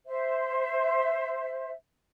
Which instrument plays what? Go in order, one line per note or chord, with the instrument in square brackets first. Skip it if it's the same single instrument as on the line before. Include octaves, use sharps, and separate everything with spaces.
[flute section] C5 E5